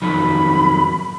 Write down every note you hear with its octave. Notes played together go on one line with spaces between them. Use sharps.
F2 D#3 F#3 B5